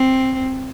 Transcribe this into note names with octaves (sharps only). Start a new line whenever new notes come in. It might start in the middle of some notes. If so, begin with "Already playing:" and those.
Already playing: C4